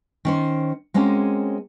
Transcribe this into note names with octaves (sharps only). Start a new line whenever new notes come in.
D#3 C#4 C5
G#3 A#3 C4 C#4 F#4